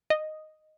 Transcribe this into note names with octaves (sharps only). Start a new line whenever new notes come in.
D#5